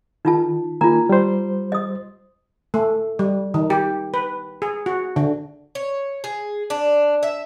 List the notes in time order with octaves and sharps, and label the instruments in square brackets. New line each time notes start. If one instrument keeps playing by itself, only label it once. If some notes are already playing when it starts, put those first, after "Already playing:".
[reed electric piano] D#3 [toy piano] D#4 F4 A5
[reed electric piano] D#3 A#3 G#5 [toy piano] F4 A#5
[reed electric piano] G3 C5
[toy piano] D#5 D#6
[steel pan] A3
G3
D#3
G4
B4
G#4
F#4
D3
[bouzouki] C#5
G#4
D4
E5